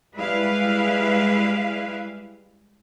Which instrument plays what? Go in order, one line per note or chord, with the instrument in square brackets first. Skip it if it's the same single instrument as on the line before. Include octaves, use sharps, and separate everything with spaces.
[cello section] G3 G#3 E4 B4 F5